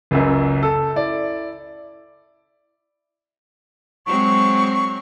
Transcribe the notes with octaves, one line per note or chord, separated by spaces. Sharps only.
F#1 C#2 F#2
A4
E4 D5
F#3 G#3 C4 C#6